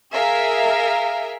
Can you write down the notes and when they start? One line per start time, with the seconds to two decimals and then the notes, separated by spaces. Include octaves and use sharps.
0.13 G#4 A#4 E5 F5